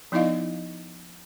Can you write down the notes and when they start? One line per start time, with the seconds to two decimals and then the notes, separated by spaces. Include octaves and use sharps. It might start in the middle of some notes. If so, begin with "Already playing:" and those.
0.12 F3 B3 D#4 E4 D#5 F5